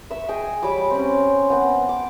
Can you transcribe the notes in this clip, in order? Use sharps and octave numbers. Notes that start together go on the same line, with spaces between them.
E5 C#6 E6
G#4 D#5 G5 G#5
G3 C#5 B5 D6
C4 C#4
B3 C4 F#5
D6